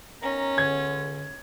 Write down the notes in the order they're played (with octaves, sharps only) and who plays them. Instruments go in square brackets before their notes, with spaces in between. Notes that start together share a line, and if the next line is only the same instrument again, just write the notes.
[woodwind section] D#3 B3 A#5 [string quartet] C#4
[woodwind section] C#2 D3 [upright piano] G#6